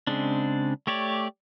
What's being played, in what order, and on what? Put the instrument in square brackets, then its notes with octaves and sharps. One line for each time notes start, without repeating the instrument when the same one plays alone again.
[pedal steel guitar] C#3 G#3 C4 D4
A3 G4 C#5 D5